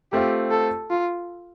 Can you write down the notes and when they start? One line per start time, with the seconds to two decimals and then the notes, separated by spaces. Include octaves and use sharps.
0.12 A3 C4 F4 G4
0.51 A4
0.91 F4